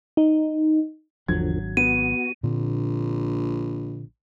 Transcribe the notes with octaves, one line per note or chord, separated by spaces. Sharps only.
D#4
G#1 E2 D3 F3 F#3 D4 G#6
B3 F#4 D#7
A#1 A#2 D3 C4